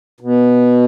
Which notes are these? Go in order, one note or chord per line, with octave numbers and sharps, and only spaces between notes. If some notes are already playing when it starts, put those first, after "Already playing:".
B2